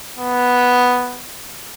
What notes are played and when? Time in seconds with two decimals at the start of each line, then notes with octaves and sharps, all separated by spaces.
0.19 B3